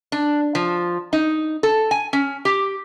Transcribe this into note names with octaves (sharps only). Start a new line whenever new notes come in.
D4
F3
D#4
A4
G#5
C#4
G4